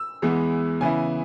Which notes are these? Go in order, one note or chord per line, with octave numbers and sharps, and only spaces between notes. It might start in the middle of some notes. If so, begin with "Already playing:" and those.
Already playing: E6
E2 E3 G#3 B3
C#3 E3 B3 E4 G#5